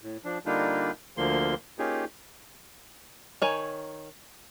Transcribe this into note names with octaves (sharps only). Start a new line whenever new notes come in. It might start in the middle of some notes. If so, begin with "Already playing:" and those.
A2
F3 D4
D3 G3 A#3 D4 D#4 F4
D2 D3 F3 A#3 C6
A#3 C#4 D#4 F4 G4 G#4
D#3 C#5 G#5